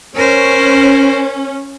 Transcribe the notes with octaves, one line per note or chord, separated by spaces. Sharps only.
C#4 A#4 C5